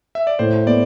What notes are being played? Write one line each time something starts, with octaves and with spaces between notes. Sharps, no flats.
E5
D5
A2 C5
B3 D5